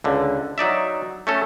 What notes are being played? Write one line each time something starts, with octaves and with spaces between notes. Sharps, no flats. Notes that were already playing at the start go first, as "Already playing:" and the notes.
C#2 D3
F#3 D#4 D5 E5
A3 C#4 A4